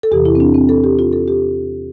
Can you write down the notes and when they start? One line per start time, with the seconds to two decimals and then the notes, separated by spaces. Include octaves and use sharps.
0.03 A4
0.11 E2 C3 E3 G4
0.26 E4
0.35 C4
0.40 D4
0.54 C4
0.69 A4
0.84 G4
0.99 F4
1.13 A4
1.28 G4